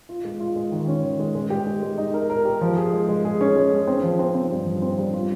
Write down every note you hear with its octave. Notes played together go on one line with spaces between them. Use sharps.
F4
G#3
F4
G#3
D#3
C#4
D#3
G#3
G#3
G4
G#3
G#3
D#4
A#4
A#4
G4
F3
G#4
G#3
G#3
G#4
C#4
G#3
G#4
C4
F3
C4
C4
G2
F3
C4
G2
F4